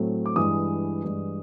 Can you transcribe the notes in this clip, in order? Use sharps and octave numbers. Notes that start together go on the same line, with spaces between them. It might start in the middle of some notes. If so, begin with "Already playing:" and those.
Already playing: A2 F#3 A3 C4
D6
G2 E3 G#3 D#6
G2 E3 G#3